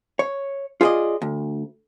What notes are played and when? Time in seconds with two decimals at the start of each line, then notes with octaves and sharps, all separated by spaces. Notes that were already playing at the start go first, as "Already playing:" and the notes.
0.19 C#5
0.81 F4 G#4 B4 D5 D#5
1.22 D2